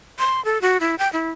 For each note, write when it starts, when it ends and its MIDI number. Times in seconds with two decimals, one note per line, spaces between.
0.19 0.43 84
0.45 0.61 69
0.62 0.77 66
0.80 0.95 64
0.99 1.11 79
1.13 1.31 64